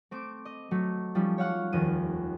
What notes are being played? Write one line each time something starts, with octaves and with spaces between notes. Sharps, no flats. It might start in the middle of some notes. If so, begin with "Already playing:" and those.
A3 C4 D6 D7
D#5
F#3 A3
F3 G3 C#4 D#4
C#5 F5 F#5 C#6
F1 D#2 F3 D#7